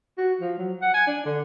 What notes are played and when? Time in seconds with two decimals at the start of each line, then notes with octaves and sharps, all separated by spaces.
0.18 F#4
0.41 F3
0.58 F#3
0.82 F#5
0.94 G#5
1.07 D4
1.26 D3